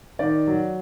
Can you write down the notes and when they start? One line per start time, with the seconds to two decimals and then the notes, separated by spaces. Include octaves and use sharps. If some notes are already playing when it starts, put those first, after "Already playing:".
0.19 D#3 D5
0.47 F#3